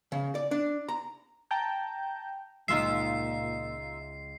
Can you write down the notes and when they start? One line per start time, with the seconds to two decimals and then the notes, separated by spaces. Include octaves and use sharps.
0.12 C#3
0.35 D5
0.51 D4
0.88 A#5
1.51 G5 A5 A#5 G6
2.68 C#2 A#2 G#3 D#4 F4 E5 C7